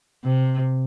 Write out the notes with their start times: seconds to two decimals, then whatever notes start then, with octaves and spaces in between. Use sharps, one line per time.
0.24 C3